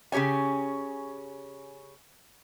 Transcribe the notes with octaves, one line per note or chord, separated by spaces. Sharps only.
C#3 C#4 G4 C#5 G#5